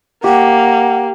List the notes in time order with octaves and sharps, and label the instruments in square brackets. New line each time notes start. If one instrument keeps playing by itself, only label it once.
[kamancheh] A#3 [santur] G4 [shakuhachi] F#5